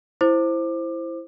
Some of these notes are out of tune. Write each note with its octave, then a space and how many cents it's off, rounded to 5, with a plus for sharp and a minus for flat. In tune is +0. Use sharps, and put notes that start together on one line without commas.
E4 +10 C5 +5 D6 +25